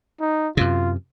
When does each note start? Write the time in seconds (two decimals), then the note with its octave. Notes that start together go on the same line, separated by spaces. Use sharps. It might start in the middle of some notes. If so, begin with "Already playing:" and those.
0.20 D#4
0.57 F#2 C3 F4